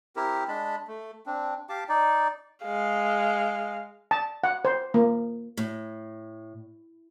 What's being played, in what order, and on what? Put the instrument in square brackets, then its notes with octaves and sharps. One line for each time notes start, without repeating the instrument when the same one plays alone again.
[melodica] C4 E4 G4 A#4
G#3 D4 A5 B5
A3
C4 D4
G4 F5 A5 D6
D#4 D5
[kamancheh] G#3 F5
[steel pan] A5
F#5
C5
A#3
[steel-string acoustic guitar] A2